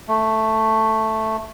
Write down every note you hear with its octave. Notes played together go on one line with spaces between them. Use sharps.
A3